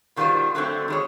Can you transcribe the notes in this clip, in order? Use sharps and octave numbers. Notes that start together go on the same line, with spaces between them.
B2 D#3 G3 A#3 F4 C5
D3 F#3 A3 C4
D#3 G#3 C#5